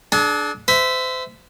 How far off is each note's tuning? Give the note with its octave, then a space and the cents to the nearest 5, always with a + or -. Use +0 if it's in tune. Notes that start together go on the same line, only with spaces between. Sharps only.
D4 +0 G#4 +45
C5 -35 E5 +0